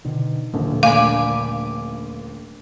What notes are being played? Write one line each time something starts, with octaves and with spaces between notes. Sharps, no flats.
B2 D3 D#3
D#1 A#1 A#2 D3
A3 A#3 D5 F5 G#5 B5